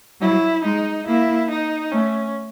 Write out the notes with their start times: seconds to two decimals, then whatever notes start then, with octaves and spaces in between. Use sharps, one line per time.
0.21 F#3 E4
0.64 G#3 D#4
1.07 A#3 E4
1.50 D#4
1.92 A3 C#4